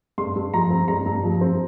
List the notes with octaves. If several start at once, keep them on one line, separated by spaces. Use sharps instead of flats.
G2 C6
G2
F3 A#5
C4
G2 A#5
G2
F3
C4